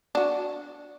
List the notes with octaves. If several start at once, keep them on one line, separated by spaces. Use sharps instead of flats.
D4 F#4